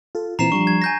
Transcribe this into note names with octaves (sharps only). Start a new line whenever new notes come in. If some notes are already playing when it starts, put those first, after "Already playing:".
F4 A4
A#2 E3 C4 A#5 C7 E7
F3 G3 D4 C#6
G#6
G#5 G6 A#6